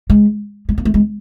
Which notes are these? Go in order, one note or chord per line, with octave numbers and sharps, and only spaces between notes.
G#3
G#3
A#3
A3
G#3